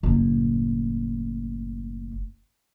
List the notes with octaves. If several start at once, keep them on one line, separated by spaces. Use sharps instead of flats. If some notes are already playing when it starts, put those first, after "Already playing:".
F#1 A2